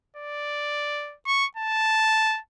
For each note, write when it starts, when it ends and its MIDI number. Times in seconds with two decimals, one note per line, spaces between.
0.17 1.15 74
1.27 1.46 85
1.57 2.39 81